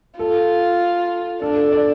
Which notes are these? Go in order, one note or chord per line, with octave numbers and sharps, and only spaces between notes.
F4 A4
D4 A4
A4
D5